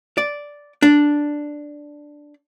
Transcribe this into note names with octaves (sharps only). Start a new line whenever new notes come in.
D5
D4